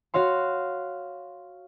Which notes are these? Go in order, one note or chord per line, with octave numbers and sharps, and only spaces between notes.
F#4 C#5 F5 C6